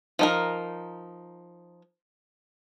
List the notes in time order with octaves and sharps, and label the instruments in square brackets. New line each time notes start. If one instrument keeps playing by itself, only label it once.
[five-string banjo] F3 D#4 A#4